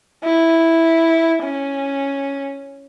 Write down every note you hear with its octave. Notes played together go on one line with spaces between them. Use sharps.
E4
C#4